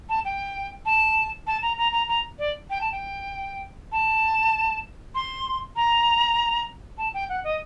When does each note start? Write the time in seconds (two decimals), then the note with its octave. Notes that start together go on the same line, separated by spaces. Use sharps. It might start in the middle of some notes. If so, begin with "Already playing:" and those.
0.09 A5
0.25 G5
0.86 A5
1.47 A5
1.62 A#5
1.78 A#5
1.92 A#5
2.08 A#5
2.39 D5
2.70 G5
2.81 A5
2.92 G5
3.92 A5
5.15 C6
5.76 A#5
6.98 A5
7.14 G5
7.29 F#5
7.44 D#5